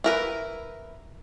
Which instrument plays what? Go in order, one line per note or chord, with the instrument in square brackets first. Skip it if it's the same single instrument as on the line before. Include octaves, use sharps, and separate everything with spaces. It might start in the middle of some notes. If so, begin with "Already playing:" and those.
[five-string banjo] E4 A#4 B4